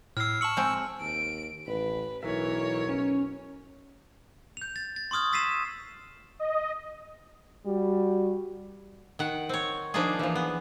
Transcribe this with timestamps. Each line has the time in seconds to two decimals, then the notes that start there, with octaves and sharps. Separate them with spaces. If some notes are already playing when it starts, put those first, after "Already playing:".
0.17 A2 E6 F6 C7
0.41 A5 C#6 E6 C#7 F#7
0.57 G#3 C4
1.00 D#2 D7
1.67 A1 B4
2.23 B1 E3 A#4 C#5 E5
2.89 C#4
4.57 G6 F7
4.76 A6
4.96 A6
5.11 C6 C#6 D#6 F6 G#6
5.32 E6 A6 B6 C7 D#7 E7
6.39 D#5
7.66 G3 F#4
9.19 D#3 F#5
9.49 C4 C#5
9.94 F3 A#3 D4 D#4 F4 G#4
10.19 E3 F3
10.35 B3